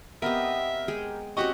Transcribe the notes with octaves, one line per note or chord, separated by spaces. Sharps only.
B3 C4 G4 A#4 D#5 E5
G#3 G#4 G5
C4 C#4 F#4 G4 D#5 C#6